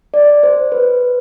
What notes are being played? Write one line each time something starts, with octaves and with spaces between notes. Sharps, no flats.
D5
C5
B4